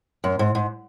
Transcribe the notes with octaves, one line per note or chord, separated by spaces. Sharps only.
F#2
G#2
G#2